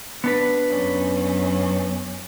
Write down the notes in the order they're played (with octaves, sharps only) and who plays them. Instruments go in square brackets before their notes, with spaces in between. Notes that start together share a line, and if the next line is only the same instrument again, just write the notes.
[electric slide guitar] B3 D4 B4
[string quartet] F#2 C#4